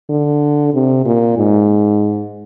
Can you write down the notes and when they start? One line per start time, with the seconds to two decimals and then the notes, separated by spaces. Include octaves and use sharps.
0.10 D3
0.74 C3
1.05 A#2
1.37 G#2